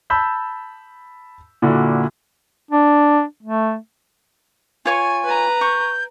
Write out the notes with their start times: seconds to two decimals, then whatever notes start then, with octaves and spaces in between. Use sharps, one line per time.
0.10 A5 B5 E6 G6 B6
1.62 A#2 D3 E4 F#4
2.71 D4
3.43 A3
4.85 F4 C#5 G#5 C#6
5.24 B4 A#5
5.61 C#6 G6